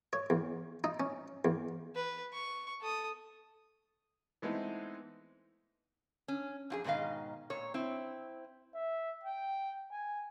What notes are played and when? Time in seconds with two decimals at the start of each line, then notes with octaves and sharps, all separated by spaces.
0.13 C#5
0.30 E2
0.84 D#4
1.00 C#4
1.45 E2
1.95 B4
2.33 C#6
2.80 A4 D#6
4.42 E3 G#3 A3 B3 C4 D#4
6.28 C#4
6.70 F2 F4 G#4
6.84 G#2 B2 D#3 D#5 F5
7.50 A#2 C#5
7.74 C4 E4
8.74 E5
9.23 G5
9.91 G#5